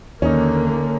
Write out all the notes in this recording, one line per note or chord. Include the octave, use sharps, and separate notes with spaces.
D#2 D3 A#3 C#4 D#4